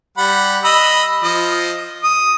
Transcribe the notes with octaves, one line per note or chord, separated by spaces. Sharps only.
G3 F#5 B5
D#5 B5 E6
F3 D#5
D#6